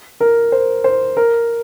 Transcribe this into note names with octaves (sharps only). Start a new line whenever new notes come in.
A#4
C5
C5
A#4